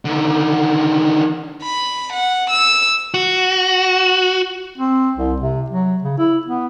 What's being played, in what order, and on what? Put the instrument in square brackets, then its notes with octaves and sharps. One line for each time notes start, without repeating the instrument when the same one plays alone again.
[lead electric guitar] D3 D#3
[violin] B5
F#5
E6
[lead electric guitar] F#4
[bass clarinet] C4
C2
C3
F#3
C#3
E4
B3